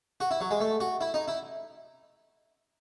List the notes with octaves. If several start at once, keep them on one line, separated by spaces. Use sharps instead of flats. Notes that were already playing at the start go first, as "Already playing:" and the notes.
F#4
E4
F#3
G#3
A3
F#4
E4
D#4
E4